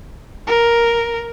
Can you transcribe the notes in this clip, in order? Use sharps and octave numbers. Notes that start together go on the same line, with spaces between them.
A#4